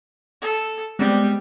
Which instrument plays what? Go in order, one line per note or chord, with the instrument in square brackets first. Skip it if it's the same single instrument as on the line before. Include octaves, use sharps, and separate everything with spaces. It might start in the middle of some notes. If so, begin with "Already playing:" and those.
[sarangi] A4
[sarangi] G3 [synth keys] G#3 B3 C4